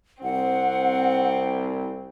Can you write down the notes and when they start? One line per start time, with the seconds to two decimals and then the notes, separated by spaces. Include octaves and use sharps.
0.23 C2 C4 F#5